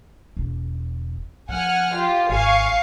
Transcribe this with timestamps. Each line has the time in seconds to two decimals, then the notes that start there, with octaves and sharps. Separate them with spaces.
0.37 E1
1.49 F3 F#5 G#5 F6
1.93 F4 G4
2.30 G#1 F5 G#5 C#6